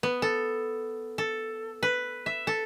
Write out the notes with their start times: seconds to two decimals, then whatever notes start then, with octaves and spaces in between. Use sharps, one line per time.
0.03 B3
0.22 A4
1.18 A4
1.83 B4
2.26 E5
2.47 A4